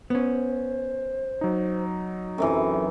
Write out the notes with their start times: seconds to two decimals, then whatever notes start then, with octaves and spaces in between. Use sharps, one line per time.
0.10 B3 C#4 C5
1.41 F#3 D#4
2.38 F#2 C3 E3 A4